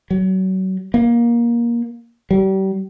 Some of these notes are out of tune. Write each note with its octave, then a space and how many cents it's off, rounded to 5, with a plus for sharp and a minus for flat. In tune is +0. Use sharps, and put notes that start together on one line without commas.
F#3 +30
A#3 +20
G3 -35